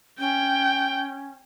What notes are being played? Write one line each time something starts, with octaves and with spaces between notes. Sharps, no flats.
C#4 G5